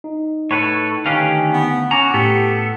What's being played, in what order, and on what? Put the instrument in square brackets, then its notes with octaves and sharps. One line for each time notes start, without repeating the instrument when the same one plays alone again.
[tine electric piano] D#4
[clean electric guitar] A2 [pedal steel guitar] A4 B4 C#5
[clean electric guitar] D2 B4 F5 [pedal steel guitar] D#3 C#4 G4
[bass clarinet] B3
[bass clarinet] C#4 [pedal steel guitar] F#4 [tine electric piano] G#5 D6 [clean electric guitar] A#5
[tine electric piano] A2 [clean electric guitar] B3 [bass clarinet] G4 [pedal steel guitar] A4